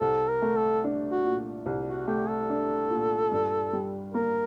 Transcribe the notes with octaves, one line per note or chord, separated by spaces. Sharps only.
C2 A4
A#4
A3
A4
D4
F#4
A#2
C2
F#4
A3 G4
A4
D4
A#2
G2
G3
A#3 A#4